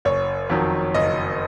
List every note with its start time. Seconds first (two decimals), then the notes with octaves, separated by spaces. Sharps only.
0.05 F#1 C#5
0.50 F2 D#3 F#3
0.94 F#1 D#5